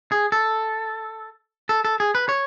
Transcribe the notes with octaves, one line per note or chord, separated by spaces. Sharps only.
G#4
A4
A4
A4
G#4
B4
C#5